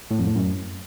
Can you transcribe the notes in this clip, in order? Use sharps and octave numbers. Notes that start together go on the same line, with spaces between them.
A2
F2
A2
F#2